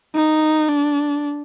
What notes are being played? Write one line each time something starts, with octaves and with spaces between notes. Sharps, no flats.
D#4
D4